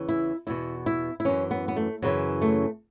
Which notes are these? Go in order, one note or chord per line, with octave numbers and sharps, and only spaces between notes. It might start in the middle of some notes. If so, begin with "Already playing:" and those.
Already playing: E2 C#3 E3
E4
E2 B2 E4
E4
E4
F#2 E3 C#4
B3
B3
A3
F#2 C#3 E3 F#3
A3